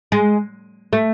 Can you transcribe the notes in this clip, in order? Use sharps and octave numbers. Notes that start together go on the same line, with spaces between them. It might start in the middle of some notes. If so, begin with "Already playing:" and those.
G#3
A3